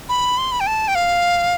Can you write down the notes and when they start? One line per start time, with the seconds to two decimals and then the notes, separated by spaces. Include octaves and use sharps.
0.09 B5
0.38 C6
0.52 B5
0.60 G5
0.67 A5
0.88 G5
0.95 F5